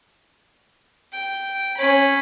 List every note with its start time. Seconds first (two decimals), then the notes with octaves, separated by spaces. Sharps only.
1.12 G5
1.77 C#4 B5